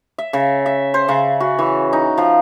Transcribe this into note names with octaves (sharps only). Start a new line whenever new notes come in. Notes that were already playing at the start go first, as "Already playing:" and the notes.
E5
C#3
E5
C5
C#3
F#4
E3
D#4
F3